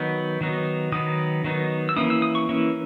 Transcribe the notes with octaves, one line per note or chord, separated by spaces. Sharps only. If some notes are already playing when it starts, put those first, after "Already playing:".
Already playing: D#3 F#3 B3 D#4
D#3 F#3 B3 D#4
D#3 F#3 B3 D#4 D#6
D#3 F#3 B3 D#4
E6
E3 A#3 C#4 E4 D#6
E6
D#6
C#6
E3 A#3 C#4 E4